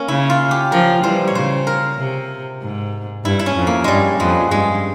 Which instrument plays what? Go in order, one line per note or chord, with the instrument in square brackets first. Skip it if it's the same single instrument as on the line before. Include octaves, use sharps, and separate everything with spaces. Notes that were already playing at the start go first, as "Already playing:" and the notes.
Already playing: [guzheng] A#3 C#4
[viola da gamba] C#3 [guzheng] E4
[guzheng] F4
G4
[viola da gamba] C#3 F3 [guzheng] A#4
[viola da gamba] E3 G3 [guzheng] C5
[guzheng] C#5
[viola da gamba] C#3 [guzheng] C5
[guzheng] A#4
[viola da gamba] C3
G#2
[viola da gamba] G2 [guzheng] E4
[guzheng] E4
C#4
[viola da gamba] F2
[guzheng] A#3
[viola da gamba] G2 [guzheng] G3 G#3
[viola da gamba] F2 [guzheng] G#3
[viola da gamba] G2 [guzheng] G#3